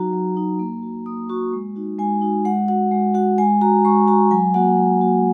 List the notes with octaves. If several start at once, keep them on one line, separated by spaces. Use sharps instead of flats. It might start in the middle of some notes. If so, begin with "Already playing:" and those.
Already playing: F#3 D#4 F#4 A#5
F#3
D#4 F#4
A#3
F#4
A#3 D#6
F#4 C#6
G#3
D#4 F#4
G#3 G#5
D#4 F#4
G#3 F#5
F#4 F#5
G#3
F#4 F#5
G#3 G#5
F#4 A#5
G#3 C#6
F#4 A#5
F#3 G#5
A#3 F#4 F#5
F#3
A#3 F#4